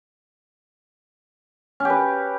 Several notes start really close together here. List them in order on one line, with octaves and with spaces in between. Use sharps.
C#4 G4 B4